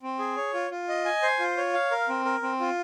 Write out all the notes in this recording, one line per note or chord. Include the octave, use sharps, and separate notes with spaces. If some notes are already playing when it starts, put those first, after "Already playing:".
C4
G#4
C#5
F4
F4
D#5
G#5
C5
F4
C#5
F5
A#4
C4
A#4
C4
F4